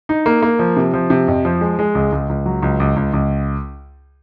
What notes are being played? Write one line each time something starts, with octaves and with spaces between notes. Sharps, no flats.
D#4
A#3
A#3
F3
C3
F3
C3
F2
F3
G#3
G#3
C#2
C#2
C#2
F#3
C#2
C#2
C#2
C#2